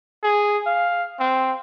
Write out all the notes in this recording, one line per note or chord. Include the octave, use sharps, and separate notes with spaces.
G#4
F5
C4